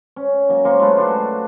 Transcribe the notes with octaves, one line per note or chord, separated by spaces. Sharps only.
C#4
F#3 A#3
A#3 C5 C#6
G#3 A3 F4 B4
D4 F#4 C6